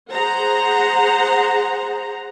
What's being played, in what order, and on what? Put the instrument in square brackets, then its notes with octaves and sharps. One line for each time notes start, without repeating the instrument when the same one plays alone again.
[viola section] G#4 C5 F#5 A#5